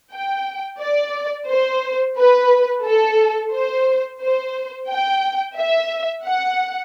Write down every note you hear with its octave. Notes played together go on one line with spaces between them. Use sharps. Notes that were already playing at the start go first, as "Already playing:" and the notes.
G5
D5
C5
B4
A4
C5
C5
G5
E5
F#5